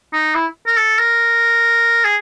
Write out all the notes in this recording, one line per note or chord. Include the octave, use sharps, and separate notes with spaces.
D#4
E4
A#4
A4
A#4
G#4